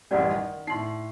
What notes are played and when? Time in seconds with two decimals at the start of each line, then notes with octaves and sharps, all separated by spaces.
0.11 A1 F#2 G3 C#4 D5 F#5
0.30 D#3
0.67 A2 D#4 C6 C7